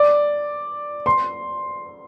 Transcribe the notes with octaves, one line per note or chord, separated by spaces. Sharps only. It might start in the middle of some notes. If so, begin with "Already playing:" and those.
Already playing: D5
C6